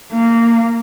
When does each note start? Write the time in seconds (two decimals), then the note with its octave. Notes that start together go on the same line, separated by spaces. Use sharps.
0.12 A#3